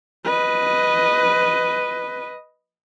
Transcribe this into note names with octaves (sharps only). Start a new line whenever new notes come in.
B4 D#5